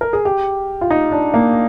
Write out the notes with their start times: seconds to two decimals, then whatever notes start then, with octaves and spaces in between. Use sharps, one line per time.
0.01 A#4
0.13 G#4
0.25 G4
0.81 F4
0.90 D#4
1.12 D4
1.34 A#3